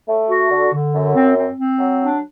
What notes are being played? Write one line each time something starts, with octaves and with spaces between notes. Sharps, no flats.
A3
F#4
D3
D3
F#2
C4
C4
C4
F#3
D4